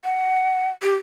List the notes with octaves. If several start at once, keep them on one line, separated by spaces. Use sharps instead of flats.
F#5
G4